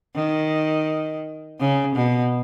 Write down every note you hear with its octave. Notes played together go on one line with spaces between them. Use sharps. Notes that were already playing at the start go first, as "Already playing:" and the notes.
D#3
C#3
B2